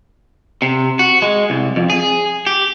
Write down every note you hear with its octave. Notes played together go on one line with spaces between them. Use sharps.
C3
F#4
G#3
C2
F2
G#4
G4